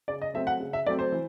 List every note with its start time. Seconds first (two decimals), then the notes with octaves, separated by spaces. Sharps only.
0.08 C#3 D5
0.22 D#5
0.34 F#3 A3 C4 E5
0.47 F#5
0.60 C#3
0.73 E5
0.87 F#3 A3 C4 D5
0.99 C5
1.12 E3